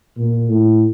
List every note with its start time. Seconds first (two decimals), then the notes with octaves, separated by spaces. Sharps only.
0.18 A#2
0.50 A2